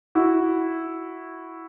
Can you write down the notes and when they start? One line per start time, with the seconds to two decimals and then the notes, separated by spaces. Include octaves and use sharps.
0.15 E4 F#4